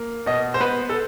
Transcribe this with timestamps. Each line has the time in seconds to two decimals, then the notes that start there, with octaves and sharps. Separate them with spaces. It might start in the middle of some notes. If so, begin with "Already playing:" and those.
Already playing: A#3
0.26 B2 D#5
0.54 C5
0.60 B3 B4
0.89 A4